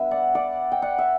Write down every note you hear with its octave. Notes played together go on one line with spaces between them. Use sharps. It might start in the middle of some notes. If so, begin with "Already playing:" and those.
Already playing: G3 B3 D4 B4 E5
D5 F#5
D5 F#5
G5
D5 F#5
E5